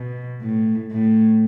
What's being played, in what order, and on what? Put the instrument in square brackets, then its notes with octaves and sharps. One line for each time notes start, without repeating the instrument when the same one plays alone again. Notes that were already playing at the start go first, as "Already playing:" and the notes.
Already playing: [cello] B2
A2
A2